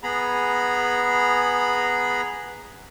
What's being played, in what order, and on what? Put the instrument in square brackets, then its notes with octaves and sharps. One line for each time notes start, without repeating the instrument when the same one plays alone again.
[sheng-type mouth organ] B3 G#4 A#5 B5